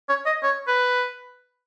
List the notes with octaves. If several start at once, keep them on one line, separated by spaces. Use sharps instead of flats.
C#5
D#5
C#5
B4